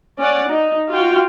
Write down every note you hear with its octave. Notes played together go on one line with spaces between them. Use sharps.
C#4 D5 F#5
D#4
F4 F#4 G5